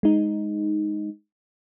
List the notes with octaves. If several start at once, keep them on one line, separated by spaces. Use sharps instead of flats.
G#3 D#4